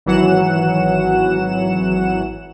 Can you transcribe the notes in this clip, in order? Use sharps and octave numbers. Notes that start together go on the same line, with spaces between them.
G#1 E3 F#3 F#5 E7